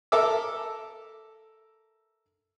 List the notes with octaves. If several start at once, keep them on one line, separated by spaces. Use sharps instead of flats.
A4 A#4 E5 D6 E6